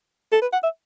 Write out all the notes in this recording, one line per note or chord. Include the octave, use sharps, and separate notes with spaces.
A4
B4
F#5
E5